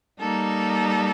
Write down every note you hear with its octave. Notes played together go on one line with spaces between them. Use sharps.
G3 A#3 D#4 A4